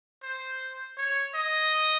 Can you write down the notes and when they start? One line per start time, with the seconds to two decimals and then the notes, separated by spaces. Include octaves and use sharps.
0.23 C5
0.97 C#5
1.35 D#5